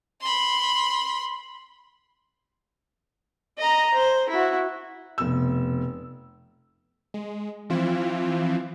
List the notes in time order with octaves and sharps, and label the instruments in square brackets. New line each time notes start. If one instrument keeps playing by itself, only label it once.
[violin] B5 C6
[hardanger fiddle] D#5 A#5
C5
E4 F#4
[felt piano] F1 B2 E6
[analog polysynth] G#3
E3 F3 C4 E4 F4